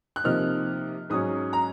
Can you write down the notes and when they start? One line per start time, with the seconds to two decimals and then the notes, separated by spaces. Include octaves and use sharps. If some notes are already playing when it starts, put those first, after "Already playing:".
0.16 F#6
0.24 C3 F3 A#3 D#4 F6
1.10 G#2 F#3 C#4 D#6
1.53 A#5